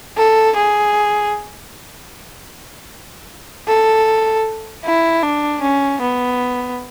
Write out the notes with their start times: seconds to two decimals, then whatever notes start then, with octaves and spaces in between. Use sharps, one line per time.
0.17 A4
0.56 G#4
3.67 A4
4.84 E4
5.23 D4
5.62 C#4
6.01 B3